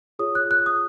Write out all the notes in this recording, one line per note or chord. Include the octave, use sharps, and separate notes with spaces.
F4 G#4 C#5 D#6
F#6
F#6
D#6